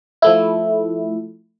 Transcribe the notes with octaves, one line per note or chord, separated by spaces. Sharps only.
F3 A3 E4